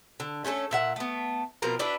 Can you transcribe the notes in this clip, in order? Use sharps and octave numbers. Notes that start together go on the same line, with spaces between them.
D3
A3 C#4 F4 A4
A#2 E5 F#5
A3 B3
B2 F3 C4 A#4
D4 E4 F#4 B4